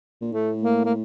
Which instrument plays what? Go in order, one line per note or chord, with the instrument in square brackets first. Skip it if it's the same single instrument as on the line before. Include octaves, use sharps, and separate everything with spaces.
[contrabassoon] A#2
[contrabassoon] A2 [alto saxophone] A3
[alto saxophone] A#3
A#3